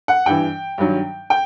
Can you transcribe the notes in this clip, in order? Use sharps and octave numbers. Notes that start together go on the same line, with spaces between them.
F#5
G2 E3 G5
G2 D#3 F#3
G5